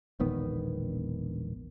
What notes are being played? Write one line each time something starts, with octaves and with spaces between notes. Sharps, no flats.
E1 A#1 D#3 B3